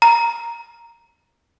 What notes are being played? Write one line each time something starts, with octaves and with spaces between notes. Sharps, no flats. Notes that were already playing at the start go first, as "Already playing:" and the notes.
A#5